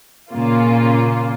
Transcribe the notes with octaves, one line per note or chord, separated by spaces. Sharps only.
A#2 C#3 A#3 F4